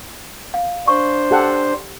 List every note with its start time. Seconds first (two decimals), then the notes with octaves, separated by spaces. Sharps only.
0.54 F5
0.88 D4 C5 C#6
1.31 G4 A4 F#5